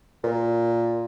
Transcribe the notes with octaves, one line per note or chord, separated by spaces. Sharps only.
A#2